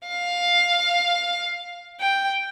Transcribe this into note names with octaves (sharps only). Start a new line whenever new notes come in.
F5
G5